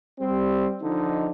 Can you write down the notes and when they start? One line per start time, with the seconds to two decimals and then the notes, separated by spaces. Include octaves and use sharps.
0.20 G3 C4
0.82 D3 F3 D#4